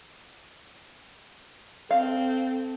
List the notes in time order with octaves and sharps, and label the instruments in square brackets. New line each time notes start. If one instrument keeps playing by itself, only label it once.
[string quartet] C4 [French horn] A4 [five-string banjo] F5